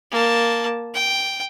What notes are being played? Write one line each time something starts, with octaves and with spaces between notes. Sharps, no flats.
A#3 A5
G5